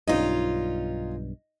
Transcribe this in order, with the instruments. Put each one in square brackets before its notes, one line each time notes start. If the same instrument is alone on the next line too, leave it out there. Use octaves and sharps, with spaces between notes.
[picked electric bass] B1 G2 [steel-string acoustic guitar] C#4 F4 [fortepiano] D#4 D#5